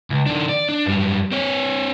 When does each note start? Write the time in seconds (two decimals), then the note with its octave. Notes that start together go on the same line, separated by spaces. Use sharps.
0.10 C#2
0.26 D#3 D4
0.49 D5
0.69 D4
0.86 F#2 G3
1.32 C4 C#5